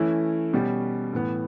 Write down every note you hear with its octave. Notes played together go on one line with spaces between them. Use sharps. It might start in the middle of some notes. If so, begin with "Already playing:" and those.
Already playing: E3 A3 C#4 E4
B2 G3 C#4 G4
A2 E3 B3